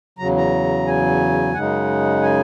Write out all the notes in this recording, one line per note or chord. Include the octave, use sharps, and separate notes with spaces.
E2 C#3 F#3 A#5
A#5
G#5
F#2 C#3 G#3 D#4 F#5
G#5